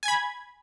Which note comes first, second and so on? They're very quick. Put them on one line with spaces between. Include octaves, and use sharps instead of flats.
G#5 G#6 B5